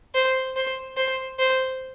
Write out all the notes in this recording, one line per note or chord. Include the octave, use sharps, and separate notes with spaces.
C5
C5
C5
C5